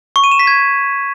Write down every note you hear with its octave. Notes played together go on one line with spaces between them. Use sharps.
C#6
D#7
E7
B6
G#6